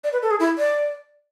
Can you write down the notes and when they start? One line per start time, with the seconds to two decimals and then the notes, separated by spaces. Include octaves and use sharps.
0.04 D5
0.13 B4
0.22 A4
0.31 G#4
0.40 E4
0.58 D5